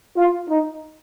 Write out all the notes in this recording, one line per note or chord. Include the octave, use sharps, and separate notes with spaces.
F4
D#4